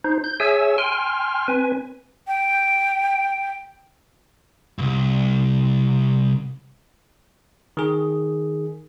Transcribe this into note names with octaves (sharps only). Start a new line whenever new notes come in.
D#4 C5
G6
G#4 C#5 E5 G#5 E6
G5 G#5 C6 F6
C4 B4 G#5
G5
C2 G2
D#3 G#4